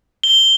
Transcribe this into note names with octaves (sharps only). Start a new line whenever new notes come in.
G7